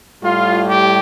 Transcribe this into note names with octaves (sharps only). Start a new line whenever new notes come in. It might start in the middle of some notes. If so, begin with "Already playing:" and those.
A2 G3 F4
G4